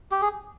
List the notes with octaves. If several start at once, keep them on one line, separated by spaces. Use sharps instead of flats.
G4
G#4